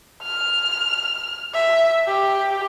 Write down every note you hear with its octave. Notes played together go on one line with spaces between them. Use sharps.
F6
E5
G4